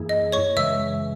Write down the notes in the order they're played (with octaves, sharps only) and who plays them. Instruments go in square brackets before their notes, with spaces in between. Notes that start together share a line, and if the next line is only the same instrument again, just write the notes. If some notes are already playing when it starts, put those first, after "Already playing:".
Already playing: [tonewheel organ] F#2 E3 A#3 E4 G#4
[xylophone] D#5
C#5 C#6
[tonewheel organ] F#2 C#3 E3 G#3 [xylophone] E5 E6